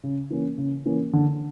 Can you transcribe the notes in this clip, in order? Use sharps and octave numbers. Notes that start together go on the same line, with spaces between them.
C#3
E3 A#3 C#4
C#3
E3 A#3 C#4
D3